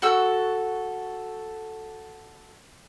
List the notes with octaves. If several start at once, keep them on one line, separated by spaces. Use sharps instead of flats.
F#4 A4 E6